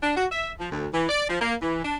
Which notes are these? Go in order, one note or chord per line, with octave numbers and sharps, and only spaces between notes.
D4
F#4
E5
F3
D2
E3
D5
F3
A#3
E3
D4